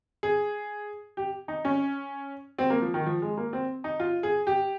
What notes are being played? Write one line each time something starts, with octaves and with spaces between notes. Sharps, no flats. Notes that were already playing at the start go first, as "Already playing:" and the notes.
G#4
G4
D#4
C#4
C4
A#3
F3
D#3
F3
G#3
A#3
C4
D#4
F4
G#4
G4